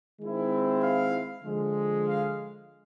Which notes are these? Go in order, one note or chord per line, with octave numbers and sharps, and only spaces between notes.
D#3 G#3 C4 E4
F5
D3 F3 G#3
F5